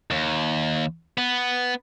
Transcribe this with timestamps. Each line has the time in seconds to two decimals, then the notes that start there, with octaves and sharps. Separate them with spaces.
0.11 D#2
1.18 B3